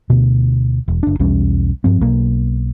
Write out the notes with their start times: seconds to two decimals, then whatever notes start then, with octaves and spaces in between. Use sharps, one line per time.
0.10 D2 B2
0.88 E1
1.03 F#1 D4
1.20 B1 E2 G3 C#4
1.84 G2 F3 C4
2.01 B1 B2 A#3